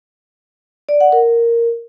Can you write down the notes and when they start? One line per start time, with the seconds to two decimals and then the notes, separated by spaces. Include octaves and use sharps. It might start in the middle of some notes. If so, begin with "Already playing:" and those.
0.89 D5
1.01 F#5
1.12 A#4